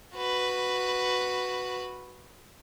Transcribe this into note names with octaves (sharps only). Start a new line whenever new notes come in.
F#4 B4